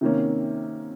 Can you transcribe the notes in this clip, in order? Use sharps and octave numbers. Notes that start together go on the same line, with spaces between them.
C3 D#3 A#3 C#4